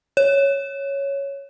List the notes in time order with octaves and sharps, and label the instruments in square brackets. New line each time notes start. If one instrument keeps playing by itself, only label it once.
[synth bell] C#5